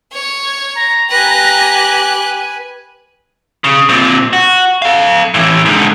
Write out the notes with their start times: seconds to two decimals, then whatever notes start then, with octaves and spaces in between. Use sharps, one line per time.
0.13 C#5
0.75 A#5
1.10 G4 B4 G#5 F#6
3.64 C#3
3.89 A#2 C4
4.33 F#4
4.82 A4 F5
5.34 A2 E3
5.65 G#2 D3